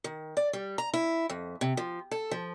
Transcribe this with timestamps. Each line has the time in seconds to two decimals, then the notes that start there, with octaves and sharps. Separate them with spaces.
0.04 D#3
0.37 D5
0.53 G3
0.78 A#5
0.94 E4
1.30 F2
1.61 C3
1.77 F3
2.11 A4
2.31 F3